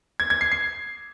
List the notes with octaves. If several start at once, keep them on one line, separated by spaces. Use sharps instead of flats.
G#6
G#6
C7
C7